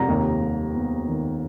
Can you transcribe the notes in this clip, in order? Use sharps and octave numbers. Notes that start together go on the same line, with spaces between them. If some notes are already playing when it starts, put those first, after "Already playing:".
Already playing: F2 C3 A#5
D#2
G3
B3
D#3